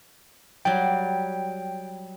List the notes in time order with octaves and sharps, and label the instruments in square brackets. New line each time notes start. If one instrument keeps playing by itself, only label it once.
[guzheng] F#3 G3 [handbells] G5